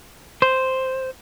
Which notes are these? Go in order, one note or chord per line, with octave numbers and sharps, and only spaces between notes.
C5